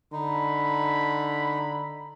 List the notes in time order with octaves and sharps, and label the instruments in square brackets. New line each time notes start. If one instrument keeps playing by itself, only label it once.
[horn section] D3 B5 [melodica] D#4